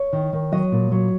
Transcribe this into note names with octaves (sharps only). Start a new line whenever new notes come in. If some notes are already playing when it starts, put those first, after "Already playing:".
Already playing: C#5
D#3
D#3
F#3 D#5
A#2
F#3